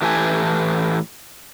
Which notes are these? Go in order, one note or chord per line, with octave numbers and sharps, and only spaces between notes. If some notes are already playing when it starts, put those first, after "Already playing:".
A2 E3 G4 A4 B4 G#5